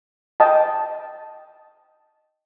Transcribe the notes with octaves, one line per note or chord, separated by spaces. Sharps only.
D#5 G5 A5